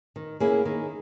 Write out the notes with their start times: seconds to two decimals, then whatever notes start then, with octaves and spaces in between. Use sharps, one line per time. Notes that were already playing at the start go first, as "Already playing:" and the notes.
0.16 D#3
0.40 A#3 C#4 E4 G#4
0.65 D#3